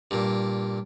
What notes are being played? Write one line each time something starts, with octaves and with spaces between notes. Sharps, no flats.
G2 A#2